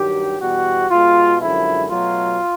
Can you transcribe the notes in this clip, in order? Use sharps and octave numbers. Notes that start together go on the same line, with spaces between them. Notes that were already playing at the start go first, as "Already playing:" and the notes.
Already playing: G2 D#3 F#3 G4
E2 B2 G3 F#4
B2 G#3 F4
F#2 D3 F3 G#3 E4
B2 F#3 A3 F4